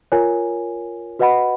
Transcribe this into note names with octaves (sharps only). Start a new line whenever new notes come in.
F4 A#4 C#5 G#5
F#4 B4 D#5 F#5 B5